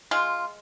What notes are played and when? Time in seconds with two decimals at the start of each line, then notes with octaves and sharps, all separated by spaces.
0.11 G#3 F4